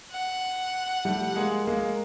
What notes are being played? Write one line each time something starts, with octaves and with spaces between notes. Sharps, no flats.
F#5
G3 A3
G#3 A#3
G#3 A#3